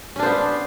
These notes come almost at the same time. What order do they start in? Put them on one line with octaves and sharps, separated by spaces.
C#4 D4 C5 B3